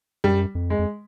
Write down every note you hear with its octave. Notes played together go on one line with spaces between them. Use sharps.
F#2 G3
F2
G#3
F2